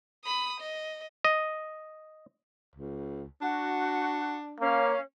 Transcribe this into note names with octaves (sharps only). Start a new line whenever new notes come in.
B5 D#6
D#5
D#5
C#2
D4 F#4
A#3 C#4 F5